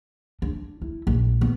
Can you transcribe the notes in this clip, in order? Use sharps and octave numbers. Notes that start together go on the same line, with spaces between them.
D4
E4
A#1
B3